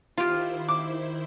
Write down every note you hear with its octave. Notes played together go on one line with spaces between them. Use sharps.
D#3 E4 F4 G4 C5
D6